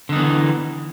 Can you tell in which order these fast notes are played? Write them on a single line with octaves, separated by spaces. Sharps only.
D3 D#4 B3 E3